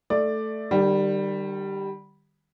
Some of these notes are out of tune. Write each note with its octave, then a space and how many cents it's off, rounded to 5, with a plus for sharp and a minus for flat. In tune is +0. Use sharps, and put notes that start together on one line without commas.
A3 +0 D5 +10
D#3 -45 G3 +0